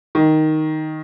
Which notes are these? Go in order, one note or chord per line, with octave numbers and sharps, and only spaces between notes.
D#3